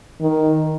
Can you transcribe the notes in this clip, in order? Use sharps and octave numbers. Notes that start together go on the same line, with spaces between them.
D#3